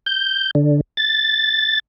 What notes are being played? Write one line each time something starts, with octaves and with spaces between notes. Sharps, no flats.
G6
D3
A6